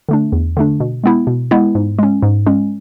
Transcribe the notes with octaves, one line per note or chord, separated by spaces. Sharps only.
D3 A3 D4
E2
D3 A3 D4
B2
G#3 B3 E4
B2
G#3 B3 E4
G#2
G#3 C#4
G#2
G#3 C#4